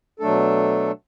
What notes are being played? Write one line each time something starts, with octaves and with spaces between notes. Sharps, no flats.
B2 F#3 A3 D4 A4